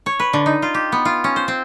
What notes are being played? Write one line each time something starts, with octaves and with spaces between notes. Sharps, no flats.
C#5
B4
D3
D#4
F4
G4
B3
F4
C#4
C5
C4